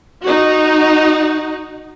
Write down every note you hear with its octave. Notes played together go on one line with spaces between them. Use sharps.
D#4 F#4